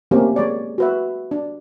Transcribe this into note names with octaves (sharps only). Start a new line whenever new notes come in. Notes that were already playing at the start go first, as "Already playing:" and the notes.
A3 A#3 C4 C#4 G4 A#4
G#3 C#5 D5
F#4 B4 E5
D4